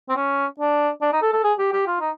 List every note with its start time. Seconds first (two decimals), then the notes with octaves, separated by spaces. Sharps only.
0.09 C4
0.16 C#4
0.60 D4
1.02 D4
1.13 D#4
1.22 A4
1.33 A4
1.44 G#4
1.59 G4
1.73 G4
1.87 F4
2.00 D#4